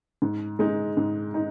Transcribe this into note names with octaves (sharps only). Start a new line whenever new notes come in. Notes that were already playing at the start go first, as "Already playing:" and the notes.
G#2
G#3 D#4
G#2
D#4